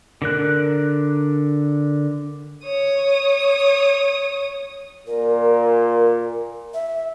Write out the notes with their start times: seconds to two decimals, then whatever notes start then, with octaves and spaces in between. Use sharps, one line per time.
0.22 D3 A#4 F#6
2.65 C#5 D#6
5.07 A#2 A#4
6.74 E5